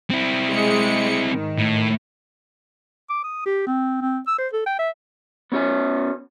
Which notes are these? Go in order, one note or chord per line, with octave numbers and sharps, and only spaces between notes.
C4 E4
G#3 C#7
G#2 D#3
A2
D6
D#6
G4
C4
C4
E6
C5
A4
G5
E5
B3 C#4 F#4 A4 C#5